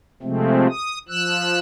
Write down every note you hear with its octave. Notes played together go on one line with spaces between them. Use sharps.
C3 F3 G#3 A3 C4
D#6
F3 E6 F#6